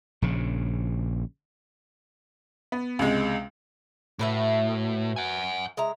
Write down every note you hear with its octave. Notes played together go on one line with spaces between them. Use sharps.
A#1 C#3
B3
C#2 C3 G#3
A2 F#4 B4 E5
F#5 G#5
G#3 E5 A#5